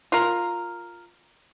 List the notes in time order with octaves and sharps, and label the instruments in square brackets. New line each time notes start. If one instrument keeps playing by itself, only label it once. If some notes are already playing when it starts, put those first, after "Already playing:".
[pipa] F4 A#4